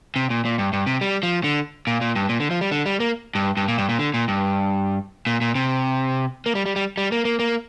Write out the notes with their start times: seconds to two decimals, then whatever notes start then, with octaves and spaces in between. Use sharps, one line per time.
0.16 C3
0.30 A#2
0.45 A#2
0.58 G2
0.73 G2
0.87 C3
1.01 G3
1.23 F3
1.44 D3
1.87 A#2
2.01 A#2
2.15 G2
2.29 A#2
2.40 D3
2.51 F3
2.61 G3
2.71 D3
2.86 G3
3.00 A#3
3.35 G2
3.57 G2
3.68 A#2
3.78 G2
3.89 A#2
3.99 D3
4.14 A#2
4.28 G2
5.27 A#2
5.41 A#2
5.55 C3
6.46 A#3
6.55 G3
6.66 G3
6.76 G3
6.97 G3
7.12 A#3
7.25 A#3
7.39 A#3